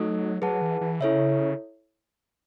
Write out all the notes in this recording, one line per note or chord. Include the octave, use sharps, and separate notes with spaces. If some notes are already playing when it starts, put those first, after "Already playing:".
Already playing: F#3 A3 D#4 A4 D#5
F#3 G#4 B4 F#5 A5
E3
E3
C#3 E4 A4 C#5 E5